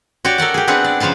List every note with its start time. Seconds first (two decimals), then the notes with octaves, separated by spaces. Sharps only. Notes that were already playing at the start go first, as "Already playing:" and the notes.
0.25 F#4 G4 C#5 D5
0.38 A4 A#4 D5 F#5
0.54 G4 G#4
0.68 B3 C4 D4 G#4 B4 F#5
0.84 D5
1.00 C#3 F3 B4 F5 A5